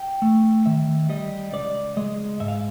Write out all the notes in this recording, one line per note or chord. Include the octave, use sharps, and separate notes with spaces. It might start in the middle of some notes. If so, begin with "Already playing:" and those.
Already playing: G5
A3
D#3 E5
G3 D#5
C#2 D5
G#3 D#5
G#2 E5
F5